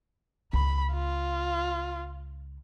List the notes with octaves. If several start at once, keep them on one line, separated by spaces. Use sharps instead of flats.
C#2 B5
F4